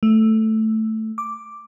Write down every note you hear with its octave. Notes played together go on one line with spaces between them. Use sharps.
A3
D6